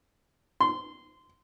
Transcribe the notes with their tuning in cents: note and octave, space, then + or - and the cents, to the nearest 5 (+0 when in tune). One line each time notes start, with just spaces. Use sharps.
C6 -15